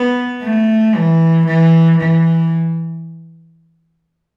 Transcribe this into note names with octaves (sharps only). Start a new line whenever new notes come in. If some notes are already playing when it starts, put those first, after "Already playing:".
Already playing: B3
A3
E3
E3
E3